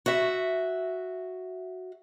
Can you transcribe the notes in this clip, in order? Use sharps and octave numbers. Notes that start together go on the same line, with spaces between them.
F#4 E5